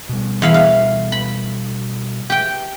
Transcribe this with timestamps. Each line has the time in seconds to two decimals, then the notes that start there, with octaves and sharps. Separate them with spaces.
0.09 B2 G3
0.42 E2 F5 B5
0.54 F5
1.12 B5
2.30 G4 G5